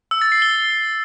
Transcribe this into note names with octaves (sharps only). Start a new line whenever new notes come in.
E6
A6
C7
G7